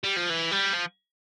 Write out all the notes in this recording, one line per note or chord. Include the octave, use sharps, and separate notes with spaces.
G3
F3
E3
G3
F3